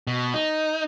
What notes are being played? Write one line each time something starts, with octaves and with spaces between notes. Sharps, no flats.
B2
D#4